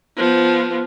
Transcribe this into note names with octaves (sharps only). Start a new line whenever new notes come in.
F3 B3